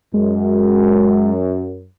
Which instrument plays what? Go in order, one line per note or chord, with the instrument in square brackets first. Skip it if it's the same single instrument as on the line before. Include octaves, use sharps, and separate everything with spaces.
[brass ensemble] F#2 [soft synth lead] G#3